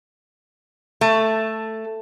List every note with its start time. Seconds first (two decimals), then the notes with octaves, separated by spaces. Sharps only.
1.01 A3